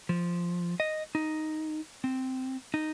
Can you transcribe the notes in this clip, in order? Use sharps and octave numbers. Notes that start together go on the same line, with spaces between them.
F3
D#5
D#4
C4
D#4